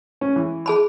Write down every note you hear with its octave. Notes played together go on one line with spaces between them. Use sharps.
C#4
E3
G#4 A5 B5